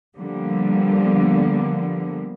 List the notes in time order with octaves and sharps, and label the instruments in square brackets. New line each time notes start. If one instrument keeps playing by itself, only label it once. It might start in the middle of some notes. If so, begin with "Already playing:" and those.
[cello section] D3 F3 G3 A#3 B3